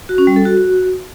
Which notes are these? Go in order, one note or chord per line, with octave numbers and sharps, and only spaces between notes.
F#4
C#4
G3
A4
F#4